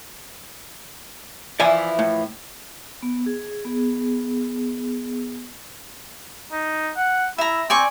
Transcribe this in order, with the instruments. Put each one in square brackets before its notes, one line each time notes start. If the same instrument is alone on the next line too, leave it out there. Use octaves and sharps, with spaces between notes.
[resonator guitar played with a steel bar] E3 F3 E4 [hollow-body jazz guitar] D5 G#5
[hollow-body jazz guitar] A2
[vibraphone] B3
G#4
B3 G#4
[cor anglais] D#4
F#5
[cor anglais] E4 [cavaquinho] E5 A#5
[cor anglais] C4 [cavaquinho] D5 G#5 C#6